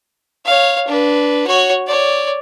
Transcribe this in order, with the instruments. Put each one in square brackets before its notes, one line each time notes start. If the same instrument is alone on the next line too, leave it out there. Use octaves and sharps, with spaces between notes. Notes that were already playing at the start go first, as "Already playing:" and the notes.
[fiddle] C#5 F5
D4 B4
F#4 C#5
C#5 D5